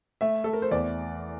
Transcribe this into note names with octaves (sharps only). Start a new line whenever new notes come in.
A3 E5
A3 A4
A#4
C5
E2 D5